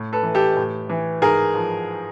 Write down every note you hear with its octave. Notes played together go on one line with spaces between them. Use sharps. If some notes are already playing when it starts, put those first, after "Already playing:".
Already playing: A2
A4 B4
E3
G4 A4
A2
E3
G#2 G#4 A#4
F3